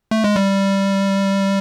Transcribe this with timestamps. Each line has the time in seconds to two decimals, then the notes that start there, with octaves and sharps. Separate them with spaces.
0.11 A3
0.24 G#3
0.36 G3